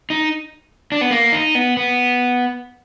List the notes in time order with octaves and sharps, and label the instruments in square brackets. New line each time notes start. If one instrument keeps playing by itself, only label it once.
[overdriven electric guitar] D#4
D4
B3
A#3
D#4
B3
B3